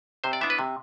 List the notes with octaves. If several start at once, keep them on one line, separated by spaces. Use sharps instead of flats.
C3 C5
D5
E3 B3 D4 E5
B4
C3